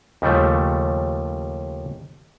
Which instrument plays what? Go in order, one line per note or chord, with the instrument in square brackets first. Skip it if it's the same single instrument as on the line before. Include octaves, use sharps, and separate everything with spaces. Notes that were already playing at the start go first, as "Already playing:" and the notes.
[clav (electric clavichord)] D#2 C#3 F3 G3 A3